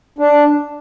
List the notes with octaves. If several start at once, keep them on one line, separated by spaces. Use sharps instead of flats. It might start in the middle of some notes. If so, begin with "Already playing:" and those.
D4